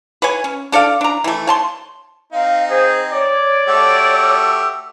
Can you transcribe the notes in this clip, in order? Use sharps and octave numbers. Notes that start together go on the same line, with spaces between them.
B4 C#5 G#5
C#4
D4 A4 D5 F5
D4 A#5
E3 A3
C#5 A5 C6
C4 D#4 F5
G#4 C5
C#5 D5
A3 F#4 G4 E6